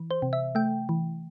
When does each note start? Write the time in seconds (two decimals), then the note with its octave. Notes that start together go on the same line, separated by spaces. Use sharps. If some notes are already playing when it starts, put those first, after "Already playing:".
Already playing: E3
0.11 C5
0.22 C3
0.33 E5
0.55 A3 G5
0.89 E3